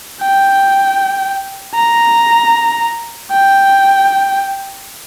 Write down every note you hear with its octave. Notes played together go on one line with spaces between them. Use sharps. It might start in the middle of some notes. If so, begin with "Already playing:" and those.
G5
A#5
G5